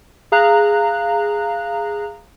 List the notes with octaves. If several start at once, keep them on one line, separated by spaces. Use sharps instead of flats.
G#4 F5 A#5 F#6